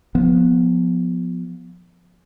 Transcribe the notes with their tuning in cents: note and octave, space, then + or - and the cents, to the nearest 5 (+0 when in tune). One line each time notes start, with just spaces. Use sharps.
F3 +20 B3 +0